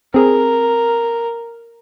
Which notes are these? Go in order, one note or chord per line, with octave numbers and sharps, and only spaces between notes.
C4 G#4 A#4